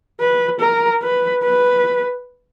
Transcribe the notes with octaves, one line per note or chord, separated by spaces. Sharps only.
B4
A#4
B4
B4